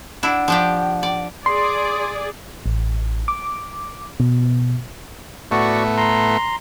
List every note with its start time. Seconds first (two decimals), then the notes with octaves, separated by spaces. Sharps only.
0.23 D4 E4 F#5
0.48 F3 D4 G4
1.03 D5
1.46 G#4 D5 C6
2.66 A1
3.28 D6
4.20 B2
5.51 A2 A3 B3 F#4 D5 C#6
5.97 A#5 C6